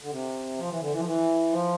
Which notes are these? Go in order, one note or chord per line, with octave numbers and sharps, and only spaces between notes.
D3
C3
F3
E3
D3
E3
F3
E3
F3